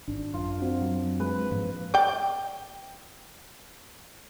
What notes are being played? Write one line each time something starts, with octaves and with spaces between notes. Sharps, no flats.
G#1 D4
F#2 F4
C4 D4 F#4
F#3
G#3 B4
G#2 F3 A#3
D5 G5